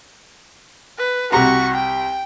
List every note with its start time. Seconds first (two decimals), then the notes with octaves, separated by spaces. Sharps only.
0.98 B4
1.32 C2 F#4 G4 A#5 C#6
1.74 G5